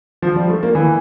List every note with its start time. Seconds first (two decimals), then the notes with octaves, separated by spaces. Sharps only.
0.22 F3
0.36 G3
0.50 A3
0.63 A#3
0.75 E3